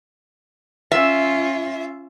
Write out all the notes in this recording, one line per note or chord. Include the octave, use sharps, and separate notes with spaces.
C#4 F4 E5